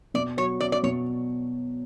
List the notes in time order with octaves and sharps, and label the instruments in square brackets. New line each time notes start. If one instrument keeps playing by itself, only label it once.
[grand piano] B2 [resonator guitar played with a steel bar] D5
[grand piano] F#3 [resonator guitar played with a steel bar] C#5
[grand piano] C#4 [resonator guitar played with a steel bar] D5
[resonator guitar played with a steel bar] D5
[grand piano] B2 [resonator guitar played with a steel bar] C#5